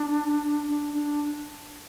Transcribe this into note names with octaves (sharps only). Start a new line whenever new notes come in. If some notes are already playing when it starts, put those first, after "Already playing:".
Already playing: D4
D4
D4